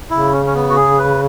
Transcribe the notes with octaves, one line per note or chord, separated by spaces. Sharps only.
C#3 E4
C#4
C#4
B3
F#4
G#4
B4